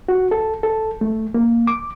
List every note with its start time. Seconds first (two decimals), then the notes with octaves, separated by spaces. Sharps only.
0.09 F#4
0.31 A4
0.63 A4
1.01 A3
1.34 A#3
1.67 D6